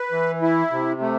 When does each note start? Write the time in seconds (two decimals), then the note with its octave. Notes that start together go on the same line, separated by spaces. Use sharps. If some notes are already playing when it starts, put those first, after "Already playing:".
Already playing: B4
0.12 E3
0.42 E4
0.71 C3
1.01 A3